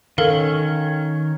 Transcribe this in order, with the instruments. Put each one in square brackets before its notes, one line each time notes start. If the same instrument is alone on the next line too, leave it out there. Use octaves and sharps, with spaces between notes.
[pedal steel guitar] D#3 C#4 [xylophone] A4 A#4 F5